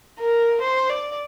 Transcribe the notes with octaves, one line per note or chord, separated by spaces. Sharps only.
A#4
C5
D5